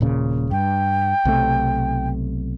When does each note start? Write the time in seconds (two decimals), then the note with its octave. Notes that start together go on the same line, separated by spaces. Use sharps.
0.01 D#1 A#2 C#3
0.51 G2 G5
1.25 B1 C3 A3